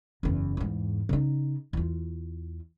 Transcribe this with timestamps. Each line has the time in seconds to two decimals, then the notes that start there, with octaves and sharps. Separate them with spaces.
0.23 F#1 E2
0.57 E2 G#2
1.09 C#3 D#4
1.73 E2 F4